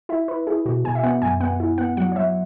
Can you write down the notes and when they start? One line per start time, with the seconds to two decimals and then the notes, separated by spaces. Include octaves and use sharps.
0.09 E4 E5
0.28 E4 B4
0.47 E4 G#4
0.66 B2 F#4
0.84 B2 G#5
0.95 E5
1.03 B3 F#5
1.22 F#2 G#5
1.40 B3 F#5
1.60 E4
1.78 B3 F#5
1.97 F#3 F#5
2.12 C#5
2.16 F#3 E5